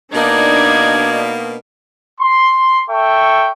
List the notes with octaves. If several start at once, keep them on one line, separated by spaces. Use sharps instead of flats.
B2 A#3 D4 D#4 D5 G#6
C6
A4 E5 G5 C#6